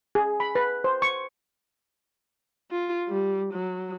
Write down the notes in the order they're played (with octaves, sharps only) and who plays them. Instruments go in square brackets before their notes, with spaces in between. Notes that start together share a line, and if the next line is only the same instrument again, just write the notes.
[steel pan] G#4
B5
B4
C5
C#6
[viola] F4
G3
F#3